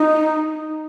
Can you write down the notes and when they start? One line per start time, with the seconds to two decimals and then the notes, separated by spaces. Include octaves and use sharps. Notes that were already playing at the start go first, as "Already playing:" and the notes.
Already playing: D#4